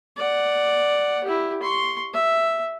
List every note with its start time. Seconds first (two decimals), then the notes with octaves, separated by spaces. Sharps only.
0.17 D5 F#5
1.24 E4 G4
1.62 C6 C#6
2.14 E5